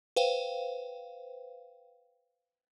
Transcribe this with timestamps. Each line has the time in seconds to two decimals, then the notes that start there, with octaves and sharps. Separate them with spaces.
0.16 B4 C5 F5 G5